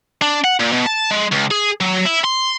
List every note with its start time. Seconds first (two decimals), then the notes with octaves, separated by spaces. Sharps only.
0.22 D4
0.44 F#5
0.60 A#2
0.73 B2
0.86 A5
1.11 G#3
1.32 C#2
1.51 G#4
1.81 F#3
2.05 E4
2.25 C6